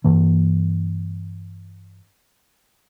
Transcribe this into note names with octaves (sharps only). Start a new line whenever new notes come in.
G2 E3 A#3